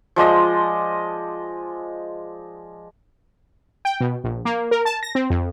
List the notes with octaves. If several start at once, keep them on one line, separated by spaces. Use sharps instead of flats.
F3 G#3 D5 D#5
G5
B2
A#1
A#3
A#4
A5
A#6
C4
F2